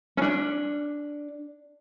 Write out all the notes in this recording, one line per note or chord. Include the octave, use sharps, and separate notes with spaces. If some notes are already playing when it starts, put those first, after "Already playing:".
C#4 D4